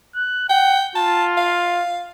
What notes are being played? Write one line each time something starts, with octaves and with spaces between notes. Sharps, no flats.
F#6
F#5 G5
F4 A5
F5